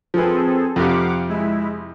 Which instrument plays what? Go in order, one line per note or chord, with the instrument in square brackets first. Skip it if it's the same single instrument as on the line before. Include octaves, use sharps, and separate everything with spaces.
[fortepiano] F3 B4 [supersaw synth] C4 G#4 A4
[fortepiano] F2 C3 [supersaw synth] F5 F#5 D6
[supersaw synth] G#3 E4